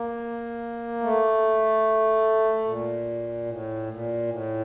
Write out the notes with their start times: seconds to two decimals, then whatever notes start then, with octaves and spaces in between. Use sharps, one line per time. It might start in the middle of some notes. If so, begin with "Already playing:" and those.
Already playing: A#3
1.01 A3
2.64 A#2
3.46 A2
3.87 A#2
4.27 A2